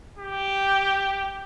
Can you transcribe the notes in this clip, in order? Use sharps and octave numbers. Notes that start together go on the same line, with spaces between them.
G4